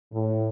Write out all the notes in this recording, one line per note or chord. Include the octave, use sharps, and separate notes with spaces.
A2